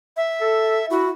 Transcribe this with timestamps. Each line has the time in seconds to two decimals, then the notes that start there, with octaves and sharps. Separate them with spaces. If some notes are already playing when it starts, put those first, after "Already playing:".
0.17 E5
0.41 A4
0.90 E4 F#4